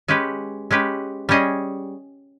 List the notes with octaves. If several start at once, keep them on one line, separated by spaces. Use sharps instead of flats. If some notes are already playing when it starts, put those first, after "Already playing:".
G#3 C#4 G4 B4
G#3 C#4 G4 B4
G3 C#4 G#4 D#5